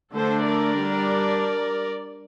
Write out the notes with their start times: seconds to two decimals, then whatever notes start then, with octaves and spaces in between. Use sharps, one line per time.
0.13 D3 A3 D4 A4 C5
0.45 A#4 D5
0.78 G3 D4